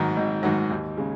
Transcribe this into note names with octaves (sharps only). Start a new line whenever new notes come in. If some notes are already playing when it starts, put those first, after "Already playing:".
Already playing: G#1 G#2 D#3 F#3
G#1
G#2 D#3 F#3
D#2
C#3 G#3